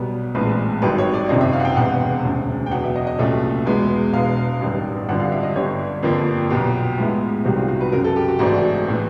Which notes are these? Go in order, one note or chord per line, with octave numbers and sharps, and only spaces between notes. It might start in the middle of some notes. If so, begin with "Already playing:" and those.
Already playing: B1 B2 G3 B3
A#1 A2 E3 G#3 C4 B4
G#1 G2 D#3 F#3 B4
C#5
D5
F#1 F2 C3 D#3 D#5
E5
F5
F#5
G5
E1 E2 C3 F#5
E1 D2 C#3
G5
E2 B2 F#3 F#5
E5
D#5
D#5
C2 A#2 F#3 A3 C#4 E5
E2 B2 G#3 B3 E4
E1 E2 B2 F5
A1 G2 D#3
G#1 G2 D3 F3 F#5
F5
E5
D#5
G1 G2 D3 G3 C#5
G1 F2 D3 F3 A#3
B1 A#2 F#3 B3 G4
A2 F3 G#3 B3 E4
C2 C3 D#3 G3 C4 F#4
F4
F#4
B4
F#2 C#3 F#3 A#4
A4
G4
F#4
G#1 G#2 E3 A3 D4 F#4
A2 E3